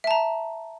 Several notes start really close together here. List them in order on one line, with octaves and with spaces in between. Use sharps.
E5 A5 A#5